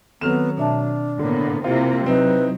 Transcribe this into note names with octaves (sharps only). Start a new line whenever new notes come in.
D#3 F#3 B3 C4 A4 F6 E7
B2 D4 E5 A5
A2 D3 A#3 B3
C3 A#3 C4 E4 F4
F#3 C4 D#4 E4 B4